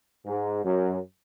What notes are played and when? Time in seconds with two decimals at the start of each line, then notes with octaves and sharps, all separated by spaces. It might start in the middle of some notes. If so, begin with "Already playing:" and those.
0.26 G#2
0.64 F#2